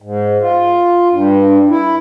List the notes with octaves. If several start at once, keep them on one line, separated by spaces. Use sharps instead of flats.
G#2
F4
G2
E4